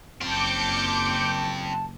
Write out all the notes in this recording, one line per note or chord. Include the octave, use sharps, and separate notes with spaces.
F#1 C4 F4 A5 D6 G6 C#7